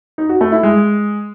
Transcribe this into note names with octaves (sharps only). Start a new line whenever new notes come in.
D#4
F#4
A3
E4
G#3